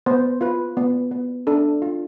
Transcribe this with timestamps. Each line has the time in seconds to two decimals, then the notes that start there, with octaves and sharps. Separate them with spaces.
0.06 B3 C5
0.41 F4 B4
0.77 B3
1.11 B3
1.47 D4 A4
1.82 F4